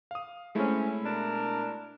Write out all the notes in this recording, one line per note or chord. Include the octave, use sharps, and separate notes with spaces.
F5 D#6
G#3 A3 C4 C#4 E4
B2 D4 A#4